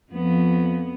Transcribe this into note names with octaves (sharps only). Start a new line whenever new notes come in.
F2 F3 B3